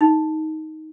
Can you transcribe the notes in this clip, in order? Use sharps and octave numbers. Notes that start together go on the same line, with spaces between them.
D#4